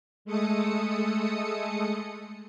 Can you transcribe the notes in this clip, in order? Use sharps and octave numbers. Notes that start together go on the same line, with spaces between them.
G#3 A3 A4 D#6 C#7